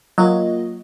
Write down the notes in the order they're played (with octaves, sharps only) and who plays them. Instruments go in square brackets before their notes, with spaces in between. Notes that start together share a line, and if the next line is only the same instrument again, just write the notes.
[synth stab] F#3 [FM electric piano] A#3 F4 D#5